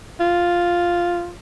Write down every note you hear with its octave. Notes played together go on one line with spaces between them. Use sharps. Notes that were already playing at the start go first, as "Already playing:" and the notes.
F4